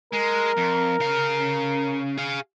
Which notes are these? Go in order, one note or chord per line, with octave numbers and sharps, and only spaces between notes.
G#3 A#4
F2
C#3 F5
G#4 F5